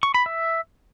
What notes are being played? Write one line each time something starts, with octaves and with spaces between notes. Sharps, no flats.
C#6
B5
E5